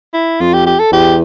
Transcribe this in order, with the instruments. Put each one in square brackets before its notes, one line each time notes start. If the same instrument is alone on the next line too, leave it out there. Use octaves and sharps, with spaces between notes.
[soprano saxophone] E4
[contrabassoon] F2 [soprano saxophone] F4
[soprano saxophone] G4
G4
A4
[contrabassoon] E2 [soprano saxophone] G4